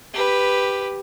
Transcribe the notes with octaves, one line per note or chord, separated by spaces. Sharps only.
G4 B4